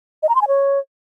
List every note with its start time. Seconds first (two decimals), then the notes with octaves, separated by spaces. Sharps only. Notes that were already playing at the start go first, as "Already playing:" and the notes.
0.23 D#5
0.29 A#5
0.35 C6
0.42 G#5
0.48 C#5